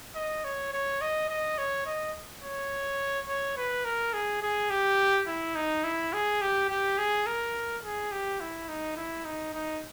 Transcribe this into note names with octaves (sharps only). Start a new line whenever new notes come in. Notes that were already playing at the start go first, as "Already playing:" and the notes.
D#5
C#5
C#5
D#5
D#5
C#5
D#5
C#5
C#5
B4
A#4
G#4
G#4
G4
E4
D#4
E4
G#4
G4
G4
G#4
A#4
G#4
G4
E4
D#4
E4
D#4
D#4